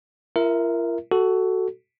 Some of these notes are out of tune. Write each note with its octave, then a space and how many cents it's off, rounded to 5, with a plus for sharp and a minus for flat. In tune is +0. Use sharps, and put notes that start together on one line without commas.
F4 -45 A#4 +0 E5 +0
F#4 +15 A4 +0